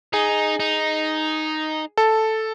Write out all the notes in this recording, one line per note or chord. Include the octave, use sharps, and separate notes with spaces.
D#4 G#4
D#4
A4